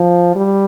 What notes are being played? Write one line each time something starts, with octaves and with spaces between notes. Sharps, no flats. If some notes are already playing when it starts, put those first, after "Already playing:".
Already playing: F3
G3